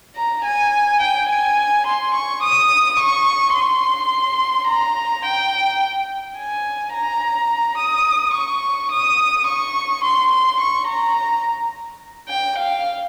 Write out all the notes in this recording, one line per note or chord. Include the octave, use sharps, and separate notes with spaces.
A#5
G#5
G5
G#5
C6
C#6
D#6
C#6
C6
A#5
G5
G#5
A#5
D#6
C#6
D#6
C#6
C6
C6
C#6
A#5
G5
F5